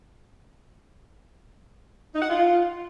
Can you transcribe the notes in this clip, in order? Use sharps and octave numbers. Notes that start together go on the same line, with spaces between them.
D#4
F#5
F4